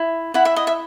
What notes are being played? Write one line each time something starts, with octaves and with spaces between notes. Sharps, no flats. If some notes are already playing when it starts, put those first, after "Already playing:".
Already playing: E4
E4 F#5
E5
D#5
E5